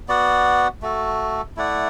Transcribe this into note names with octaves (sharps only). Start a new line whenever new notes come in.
B3 F#4 D5 F#5
A3 F#4 A4
A3 E4 D5 F#5